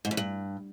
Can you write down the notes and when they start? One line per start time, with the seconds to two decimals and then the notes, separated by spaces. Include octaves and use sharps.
0.05 G#2
0.11 F2
0.17 G2